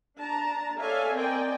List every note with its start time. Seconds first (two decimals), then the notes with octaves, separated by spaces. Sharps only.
0.19 D4 A5 A#5
0.78 A4 C#5 D5 E5 F5 G#5
1.14 C4 A#4 D5 D#5 G5 G#5